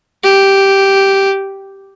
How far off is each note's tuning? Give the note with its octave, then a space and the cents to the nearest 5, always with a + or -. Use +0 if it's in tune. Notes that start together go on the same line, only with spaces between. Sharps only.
G4 -5